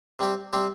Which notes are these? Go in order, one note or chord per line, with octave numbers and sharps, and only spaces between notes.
C3 G3 C4 G4
C3 G3 C4 G4